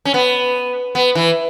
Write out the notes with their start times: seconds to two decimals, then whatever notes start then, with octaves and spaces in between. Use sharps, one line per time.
0.05 C#4
0.14 B3
0.95 B3
1.15 E3